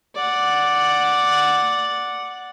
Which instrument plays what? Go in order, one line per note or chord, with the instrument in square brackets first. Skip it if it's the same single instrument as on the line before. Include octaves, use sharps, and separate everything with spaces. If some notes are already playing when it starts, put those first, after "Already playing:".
[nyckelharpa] D5 F#5